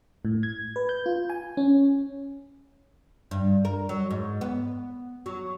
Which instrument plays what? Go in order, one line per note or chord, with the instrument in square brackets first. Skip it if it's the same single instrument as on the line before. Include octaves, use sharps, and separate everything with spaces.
[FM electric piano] A2
G#6
B4
G6
F4
G#5
C#4
[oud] G2
A#4
F#3
G#2
B3
F#3